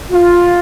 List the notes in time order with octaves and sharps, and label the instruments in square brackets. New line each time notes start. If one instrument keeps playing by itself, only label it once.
[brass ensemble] F4